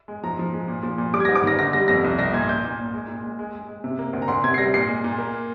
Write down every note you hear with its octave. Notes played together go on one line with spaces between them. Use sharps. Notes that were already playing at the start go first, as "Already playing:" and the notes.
G#3
F3 A#5
F3
G#3
A#2
F3
A#2
G3 D6
G#6
G#2 A#6
D6
D#3 A#6
D3 A#6
G3 A#6
F2 A#6
C2
C2 A#6
A#2 G#6
A#2 G6
A#2
A#2
G#3
A#2
G#3
G#3
G#3
G#3
C3
A#3
D2
A#5
D2 C6
C3 G#6
C7
G3 A#6
A#2 C7
G#3
A#2
A#3